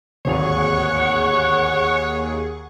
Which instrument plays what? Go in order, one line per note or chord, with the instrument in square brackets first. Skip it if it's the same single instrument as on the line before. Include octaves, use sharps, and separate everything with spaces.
[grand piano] D1 G#1 F7 [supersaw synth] D#2 G#4 [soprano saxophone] C#5 [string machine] F#5 C#6